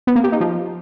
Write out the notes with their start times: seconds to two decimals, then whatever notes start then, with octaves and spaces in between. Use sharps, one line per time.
0.07 B3
0.16 A#3
0.24 G4
0.32 D#4
0.40 F3